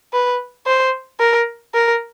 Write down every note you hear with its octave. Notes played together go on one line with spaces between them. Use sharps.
B4
C5
A#4
A#4